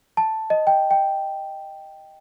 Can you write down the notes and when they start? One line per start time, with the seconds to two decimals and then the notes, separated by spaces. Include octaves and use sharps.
0.17 A5
0.50 D#5
0.67 G5
0.91 G5